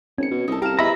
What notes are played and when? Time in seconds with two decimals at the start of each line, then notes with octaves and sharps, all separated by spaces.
0.18 G#1 C#4 C#7
0.31 B2
0.48 C2 D#4 A4
0.62 C2 G4 F5 A#5 E7
0.79 E2 D#5 E5 G#5 A#5 B5